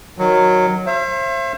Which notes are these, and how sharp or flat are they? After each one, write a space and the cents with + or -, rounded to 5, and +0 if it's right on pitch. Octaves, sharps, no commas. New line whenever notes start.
D#3 +0 F#3 -5
C5 +35 E5 +40